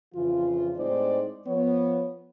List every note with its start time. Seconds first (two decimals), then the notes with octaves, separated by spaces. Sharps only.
0.14 F2 C#3 E3 F4
0.77 A2 G#3 C4 D#4 C5 D5
1.47 F3 B3 C#5